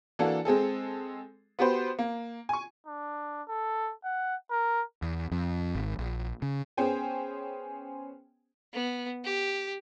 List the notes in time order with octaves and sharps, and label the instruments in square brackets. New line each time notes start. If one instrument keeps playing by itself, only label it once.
[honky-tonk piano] E3 A#3 D4 F#4 A4
G#3 C4 G#4 A4
B3 F#4 G4 B4 C5
A#3
G#5 C#6
[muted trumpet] D4
A4
F#5
A#4
[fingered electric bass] E2
F2
G#1
A#1
C#3
[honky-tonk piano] B3 C#4 G#4 C5 G5 G#5
[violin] B3
G4